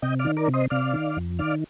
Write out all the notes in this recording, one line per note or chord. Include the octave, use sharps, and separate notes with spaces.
C3 D#5 G5
D5 F5
D#3
A#4 D5
C3
C5 D#5
C3 D5 F5
D#3
F2
D#3 D5 F5